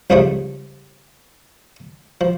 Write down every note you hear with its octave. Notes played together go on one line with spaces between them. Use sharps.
C2 G#2 C#3 F3 G3 A3
F3